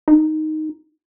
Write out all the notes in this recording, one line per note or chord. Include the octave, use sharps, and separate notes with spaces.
D#4